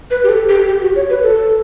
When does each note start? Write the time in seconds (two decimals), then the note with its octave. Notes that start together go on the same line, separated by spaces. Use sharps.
0.11 B4
0.24 G4
0.29 A4
0.49 G4
0.67 G4
0.82 F#4
0.95 C#5
1.10 B4
1.23 A4